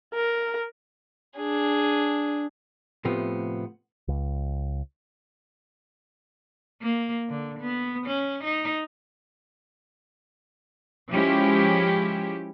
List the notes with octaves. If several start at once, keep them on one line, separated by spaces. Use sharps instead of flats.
A#4
D4 G#4
A2 C3 F3 A3 B3
C#2
A#3
D3
B3
C#4
D#4
F3 G#3 C#4 E4 G4